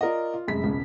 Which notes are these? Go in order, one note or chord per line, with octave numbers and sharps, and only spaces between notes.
F4 A#4 D5 D#5
F4
F1 F#2 G#3 B6
E1 C#2 C#3